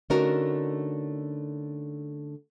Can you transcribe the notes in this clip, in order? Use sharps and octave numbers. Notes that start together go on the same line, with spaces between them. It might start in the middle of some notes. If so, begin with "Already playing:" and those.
D3 A3 C#4 D#4 F#4 A#4